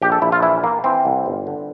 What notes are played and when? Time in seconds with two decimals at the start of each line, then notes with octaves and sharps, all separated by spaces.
0.02 A#1 G4
0.12 A4
0.22 A#1 E4
0.32 F4
0.43 E3 E4
0.64 E3 A#3
0.84 E3 C4
1.05 C2
1.26 G1
1.47 D3